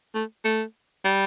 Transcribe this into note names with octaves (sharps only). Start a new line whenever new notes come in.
A3
A3
G3